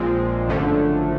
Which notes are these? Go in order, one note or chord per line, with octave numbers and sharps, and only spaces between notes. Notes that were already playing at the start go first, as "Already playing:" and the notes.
Already playing: A#1 A#2 F3 G#3 C4
G#1 F#2 D3 F3 A3